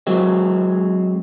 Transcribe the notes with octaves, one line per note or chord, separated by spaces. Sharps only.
F#3 G#3 C4